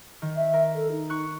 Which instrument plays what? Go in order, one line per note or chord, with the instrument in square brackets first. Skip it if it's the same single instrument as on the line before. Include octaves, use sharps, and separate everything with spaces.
[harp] D#3
[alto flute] E5
[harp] A#4
[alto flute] A4
D#4
[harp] C#6 F#6